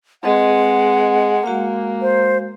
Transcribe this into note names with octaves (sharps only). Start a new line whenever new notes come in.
G#3 C4 B4 D#5 F#5
G#3 A#3 F#4 F5
C5